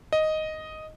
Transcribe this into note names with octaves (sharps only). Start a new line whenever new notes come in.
D#5